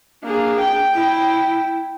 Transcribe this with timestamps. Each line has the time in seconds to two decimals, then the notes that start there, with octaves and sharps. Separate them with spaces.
0.24 A#3 D4 G#4
0.61 G5
0.95 E4